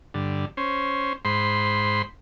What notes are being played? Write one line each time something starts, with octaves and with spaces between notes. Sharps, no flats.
G2 D3
C#4 C5
G#2 C5 B5 C6